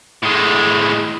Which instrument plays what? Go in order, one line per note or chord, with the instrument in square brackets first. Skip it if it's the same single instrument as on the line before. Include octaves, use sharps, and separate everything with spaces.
[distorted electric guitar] A2 G#3